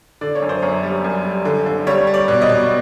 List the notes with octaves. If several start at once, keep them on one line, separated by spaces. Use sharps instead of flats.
D3 D5
C#5
F#2
C5
F#2 C#5
G3
F#2
G3
D3
D3
G3 C#5
G3
D5
B2
D#5
B2